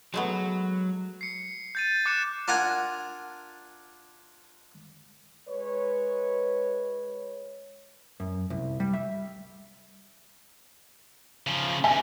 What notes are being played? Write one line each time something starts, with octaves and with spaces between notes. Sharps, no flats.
F#3 G#3 A3 B3
C7 C#7
G6 A6 D#7
D6 F#6 C#7 E7
D4 F4 A#4 F5 F#5 G#5
G#3 B4 C#5
F#2
C2
G3
E5
C#3 F3
D2 G2 E5 G#5